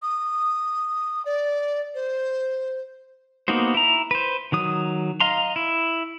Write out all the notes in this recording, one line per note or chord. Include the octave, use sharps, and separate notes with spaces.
D#6
D5
C5
A#3 B3 D#4 F#4 C5
E4 A#5
B4 C5
D#3 F#3 D#6
D#5 F5 A#5 C6
E4